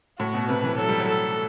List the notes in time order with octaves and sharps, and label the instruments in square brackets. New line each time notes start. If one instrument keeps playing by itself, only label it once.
[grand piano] A2 [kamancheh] F#4
[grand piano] B2
[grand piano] C3 [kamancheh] B4
[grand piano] E3
[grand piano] F#3 [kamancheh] A4
[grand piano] G3
F#3
[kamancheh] A4